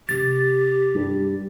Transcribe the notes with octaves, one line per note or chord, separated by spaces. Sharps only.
C3 C#4 G4 A6
G2